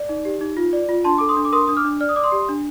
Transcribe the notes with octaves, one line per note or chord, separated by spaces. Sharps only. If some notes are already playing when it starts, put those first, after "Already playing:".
Already playing: D5
D#4
G4
D#4
F4
D5
F4
D4 A5 C6
A4 D6
C6 D#6
D4
D6
A#4 C6 D#6
D4 D#6
D6 F6
D4
D5 F6
D#6
D5 D6
C6 D#6
G4
D4